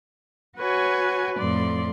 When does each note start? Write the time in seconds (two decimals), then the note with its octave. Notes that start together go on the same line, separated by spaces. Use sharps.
0.58 F#4 B4 C#5 G#5
1.38 F2 A2 D5 C6